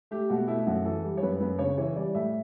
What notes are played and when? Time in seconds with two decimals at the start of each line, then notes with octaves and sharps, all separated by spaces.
0.11 A3 G4
0.30 B2 F#4
0.48 A3 E4
0.67 F#2 F#4
0.85 E3 A4
1.04 G3
1.17 C#5
1.23 F#2 B4
1.40 F#2 B4
1.59 C#3 C#5
1.78 E3 C#5
1.96 G3 D5
2.15 A2 E5